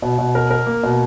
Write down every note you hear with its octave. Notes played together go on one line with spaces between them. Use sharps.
B2
B2
A#4
A#4
A#3
B2